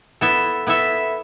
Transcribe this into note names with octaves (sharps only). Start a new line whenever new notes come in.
B3 E4 A4 E5
B3 E4 A4 E5